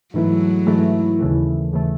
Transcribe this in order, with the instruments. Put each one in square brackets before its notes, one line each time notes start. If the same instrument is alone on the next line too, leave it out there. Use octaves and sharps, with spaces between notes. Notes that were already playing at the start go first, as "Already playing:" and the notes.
[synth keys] G#2 E3 A3 E4 [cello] F#3
[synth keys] G#2 E3 A3 E4
D#2 C#3 E3 A3
D#2 C#3 E3 A3